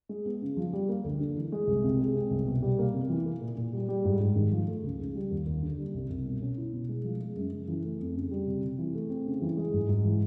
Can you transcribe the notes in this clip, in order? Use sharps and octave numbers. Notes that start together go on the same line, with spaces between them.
G#3
B3
C#3
F3
G3
A#3
D2
D3
E3
G#3
C2
C3
G#3
C4
C2
B2
G3
A#3
C3
E3
A#3
A#2
A#2
G3
G3
G#2
G#2
D#3
F3
A3
C#2
C#3
G3
D#2
D#2
D3
G3
C2
C2
B2
C#4
E4
B2
G#3
F3
G#3
F#2
C#3
E3
A3
F2
C#3
G3
C3
C3
E3
A3
C4
C#3
E3
G#3
G#2
G#2
E3